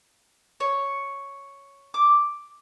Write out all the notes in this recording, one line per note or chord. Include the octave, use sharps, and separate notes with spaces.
C#5
D6